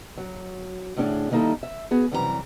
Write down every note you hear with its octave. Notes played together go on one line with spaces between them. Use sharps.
F#3
D2 A2 C#4 D4 G#4
D#3 G3 A#3 D#4 E4 A4
E5
B3 F#4 G#4
F#2 C3 E3 G3 F#4 A#5